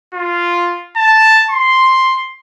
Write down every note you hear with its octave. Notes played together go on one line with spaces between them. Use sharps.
F4
A5
C6